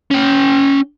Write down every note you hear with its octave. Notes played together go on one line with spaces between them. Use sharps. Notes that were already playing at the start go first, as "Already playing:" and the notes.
C#4 G5